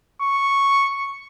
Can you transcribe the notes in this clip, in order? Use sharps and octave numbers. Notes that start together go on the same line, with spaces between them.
C#6